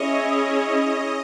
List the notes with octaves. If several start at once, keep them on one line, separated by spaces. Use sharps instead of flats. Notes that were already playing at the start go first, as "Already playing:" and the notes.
Already playing: C#4 E4 G#4 C#5 D#5